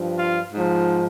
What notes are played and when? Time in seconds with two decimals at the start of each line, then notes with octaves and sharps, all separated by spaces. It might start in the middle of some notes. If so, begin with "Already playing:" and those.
Already playing: G2 F3
0.19 F4
0.53 G#2 F3